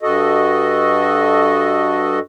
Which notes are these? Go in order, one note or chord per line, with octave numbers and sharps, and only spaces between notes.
G2 F#4 A4 D#5